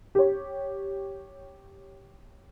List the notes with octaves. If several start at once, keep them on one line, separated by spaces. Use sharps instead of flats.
G4 C#5